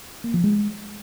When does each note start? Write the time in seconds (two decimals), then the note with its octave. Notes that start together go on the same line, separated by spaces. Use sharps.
0.24 A#3
0.34 F3
0.44 G#3